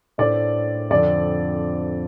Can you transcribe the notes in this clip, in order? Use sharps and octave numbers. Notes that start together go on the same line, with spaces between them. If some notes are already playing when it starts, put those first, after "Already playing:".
A2 A3 D4 A4 C5 D5
F2 D3 F3 C4 D5